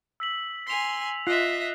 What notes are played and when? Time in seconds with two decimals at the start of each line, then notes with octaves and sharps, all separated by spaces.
0.20 E6 B6 F#7
0.67 G#5 C6 B6 F7
1.27 F4 D#5 E5 F#6 C7